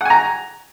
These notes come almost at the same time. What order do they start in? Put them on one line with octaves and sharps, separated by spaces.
F#5 G#5 A#5